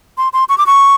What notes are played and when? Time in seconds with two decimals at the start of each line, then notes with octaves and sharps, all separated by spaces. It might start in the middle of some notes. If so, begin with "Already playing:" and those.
0.18 C6
0.33 C6
0.49 C#6
0.58 D6
0.66 C#6